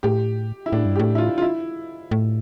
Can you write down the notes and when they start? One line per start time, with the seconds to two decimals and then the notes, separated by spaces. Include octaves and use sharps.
0.03 A2 G4
0.66 E4
0.72 A2 D4
0.86 G2
0.96 A2 G4
1.15 E4
1.18 F4
1.38 F4
1.42 E4
2.11 A2